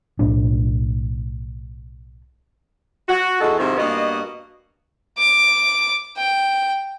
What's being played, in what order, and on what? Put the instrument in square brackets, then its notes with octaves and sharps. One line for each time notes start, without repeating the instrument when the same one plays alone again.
[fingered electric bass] B1 A2 F3 D4
[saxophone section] F#4
E2 G#3 D#4 F#4 A4 F#5
G#2 C3 D#3 F3 D#4 E4
G2 A#3 B3 F#4 D#5
[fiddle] D6
G5